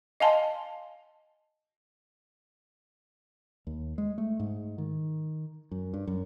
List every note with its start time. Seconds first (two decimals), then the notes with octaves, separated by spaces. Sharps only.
0.20 D#5 F5 G#5 A5 C6
3.67 D#2
3.98 G#3
4.18 A3
4.39 G#2
4.78 D#3
5.71 F#2
5.94 G2
6.07 F#2